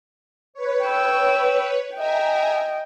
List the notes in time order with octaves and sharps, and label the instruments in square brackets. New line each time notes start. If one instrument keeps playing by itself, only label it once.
[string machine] B4 C#5
[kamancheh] G5 E6
[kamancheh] D#5 G5 [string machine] E5 G#5 A#5